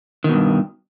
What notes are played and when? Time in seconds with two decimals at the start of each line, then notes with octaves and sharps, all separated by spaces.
0.24 D#3
0.29 B2
0.34 G2